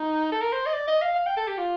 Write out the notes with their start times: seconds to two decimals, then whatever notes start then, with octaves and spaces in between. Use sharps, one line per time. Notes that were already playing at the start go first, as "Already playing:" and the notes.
Already playing: D#4
0.32 A4
0.42 A#4
0.53 C5
0.66 D#5
0.74 D5
0.88 D#5
1.02 F5
1.16 F5
1.26 G5
1.37 A4
1.48 G4
1.58 F4